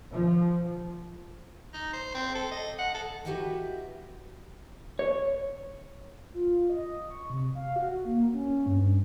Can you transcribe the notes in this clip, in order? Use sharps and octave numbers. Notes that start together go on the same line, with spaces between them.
F3
D#4
C5
C4
A4
D#5
F#5
A4
E4 F#4 G4 B4 D#5 G5
C#5
F4
D#5
C#6
C3
F5
F#4
A#3
C#4
G2